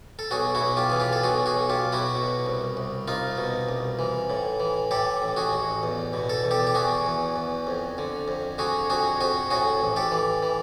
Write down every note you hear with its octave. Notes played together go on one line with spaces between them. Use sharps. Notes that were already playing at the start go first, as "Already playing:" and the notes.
A4
B1 F#4 G#4
E4 F#4
B1
F4 G4
E3 G#4
F4 G4
A4
B1 F#4 G#4
F#4 G#4
B1
F4 G4
B1
E4 F#4
B2
C2
C2
C2 D#4 F4
B2
C2
E3
A2
E3
A2 G4 A4
A1
F#4 G#4
A1
E2
B2
A4
E2
G4 A4
G4
E2 F#4 G#4
E2
E2
F2
D3
F2
D3 F#4 G#4
F2 F#4 G#4
F2 F#4 G#4
A2 F#4 G#4
A1
G4 A4
E3
E3